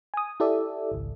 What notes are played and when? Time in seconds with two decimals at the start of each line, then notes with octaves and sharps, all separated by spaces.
0.14 G#5 D#6
0.40 E4 G4 A4 D5 E5
0.91 G#1 C#2